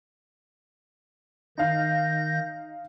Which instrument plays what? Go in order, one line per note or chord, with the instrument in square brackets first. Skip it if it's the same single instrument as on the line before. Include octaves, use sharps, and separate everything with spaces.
[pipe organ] D#3 G6 A#6 [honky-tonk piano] D#4 F5